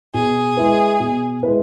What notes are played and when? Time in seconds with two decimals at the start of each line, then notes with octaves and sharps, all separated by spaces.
0.14 B2 G#4
0.57 G#3 E4 B4
1.00 B2
1.43 G#3 E4 B4